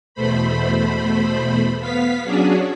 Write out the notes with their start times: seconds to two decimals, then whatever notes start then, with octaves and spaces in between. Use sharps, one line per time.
0.15 E2 B2 A3 C5 B5
1.80 B3 F5 B6
2.24 F#3 C#4 D4 F#4 G#4